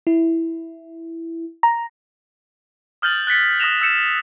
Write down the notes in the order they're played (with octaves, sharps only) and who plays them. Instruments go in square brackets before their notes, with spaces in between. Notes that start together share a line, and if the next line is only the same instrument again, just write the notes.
[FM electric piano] E4
A#5
[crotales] D#6 F6 G6 A6 F#7
F#6 A6 B6 C#7
D#6 G6 A#6 E7 F7
E6 G6 C#7 E7